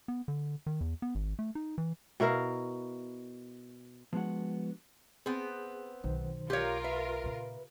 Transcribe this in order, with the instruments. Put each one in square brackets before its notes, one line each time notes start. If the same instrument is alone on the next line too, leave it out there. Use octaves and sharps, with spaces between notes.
[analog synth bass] B3
D3
D#3
E2
B3
G#1
A3
D#4
E3
[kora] B2 E4 A#4 F5
[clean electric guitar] F3 G#3 B3 D4 F#4 F#5
[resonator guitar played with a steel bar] B3 C4 [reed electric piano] G#4
[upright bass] B1 [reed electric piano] D#3 C5
[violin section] F4 A#4 [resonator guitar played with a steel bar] G4 C#5
[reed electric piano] B4 [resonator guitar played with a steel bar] E5
[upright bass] A#2 C#3